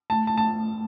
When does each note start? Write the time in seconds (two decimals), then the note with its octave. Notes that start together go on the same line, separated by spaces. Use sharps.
0.10 A3 A5
0.27 A5
0.37 A5